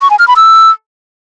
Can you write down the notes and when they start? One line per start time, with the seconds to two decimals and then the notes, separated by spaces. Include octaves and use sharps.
0.02 C#6
0.10 G#5
0.19 F6
0.28 B5
0.36 E6